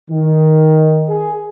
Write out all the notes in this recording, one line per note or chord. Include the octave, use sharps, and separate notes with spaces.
D#3
G#4